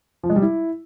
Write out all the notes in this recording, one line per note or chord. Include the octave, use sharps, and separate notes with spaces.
F3
G#3
G3
E4